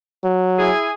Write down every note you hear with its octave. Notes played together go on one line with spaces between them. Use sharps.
F#3
E4 G#4